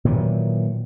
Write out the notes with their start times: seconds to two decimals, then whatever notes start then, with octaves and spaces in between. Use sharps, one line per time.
0.05 A#2 D#3 E3 F#3